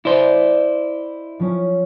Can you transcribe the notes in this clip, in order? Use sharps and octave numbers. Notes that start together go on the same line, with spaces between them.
E4 C5 D5 D#5
F3 C#4